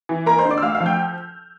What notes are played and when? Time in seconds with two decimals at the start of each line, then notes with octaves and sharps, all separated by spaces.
0.09 E3
0.26 A#3 A#4 A#5
0.39 C5 C6
0.45 D3
0.50 D5 D6
0.58 E6
0.62 D2 F5 F6
0.75 F5 F6
0.80 F3
0.86 G5 G6